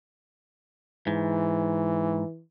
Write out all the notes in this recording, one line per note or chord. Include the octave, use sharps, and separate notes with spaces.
G#2 E3